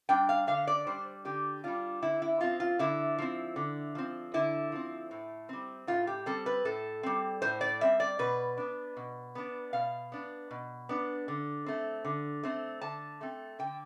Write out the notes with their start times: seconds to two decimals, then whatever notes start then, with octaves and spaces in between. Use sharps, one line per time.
0.09 G3 D4 G5
0.29 F5
0.47 D3 F5
0.67 D5
0.87 G3 D4 C5
1.25 D3 G4
1.64 G3 D4 F4
2.02 D3 E4
2.22 E4
2.41 F3 C4 F4
2.60 F4
2.79 D3 E4
3.19 F3 C4
3.56 D3
3.95 F3 C4
4.34 D3 E4
4.72 F3 C4
5.11 A2
5.49 G3 C4
5.87 A2 F4
6.07 G4
6.26 G3 C4 A4
6.46 B4
6.65 A2 A4
7.03 G3 C4
7.42 A2 C5
7.61 D5
7.81 G3 C4 E5
8.00 D5
8.19 B2 B4
8.57 B3 D4
8.97 B2
9.35 B3 D4
9.73 B2 F5
10.12 B3 D4
10.51 B2
10.89 B3 D4
11.28 D3
11.66 A3 C4
12.05 D3
12.43 A3 C4
12.81 D3 A5
13.21 A3 C4
13.59 D3 G5